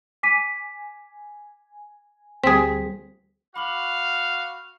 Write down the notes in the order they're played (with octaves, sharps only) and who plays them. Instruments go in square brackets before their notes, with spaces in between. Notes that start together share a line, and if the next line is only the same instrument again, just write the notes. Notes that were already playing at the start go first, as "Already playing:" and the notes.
[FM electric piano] G#5 [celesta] D6 B6 D#7
[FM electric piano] D2 G3 [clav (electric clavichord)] C4 G#4 [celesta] B6
[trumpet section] F#4 F5 [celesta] B5 D6 F#7